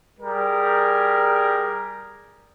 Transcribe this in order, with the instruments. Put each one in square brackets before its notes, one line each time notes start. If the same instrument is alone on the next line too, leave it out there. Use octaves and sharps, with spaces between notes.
[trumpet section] G3 G#4 A#4